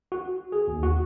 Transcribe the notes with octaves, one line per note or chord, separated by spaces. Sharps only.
F#4
G#4
D#2
F#4